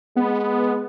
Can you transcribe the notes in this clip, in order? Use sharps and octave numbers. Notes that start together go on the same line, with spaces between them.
G#3 B3